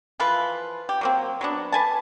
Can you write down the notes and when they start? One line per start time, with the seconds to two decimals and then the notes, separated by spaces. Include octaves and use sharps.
0.20 E3 F3 F4 B4
0.89 G4
1.01 F#3 A#3 C4
1.41 F#3 B3 D4
1.72 B4 G#5 A5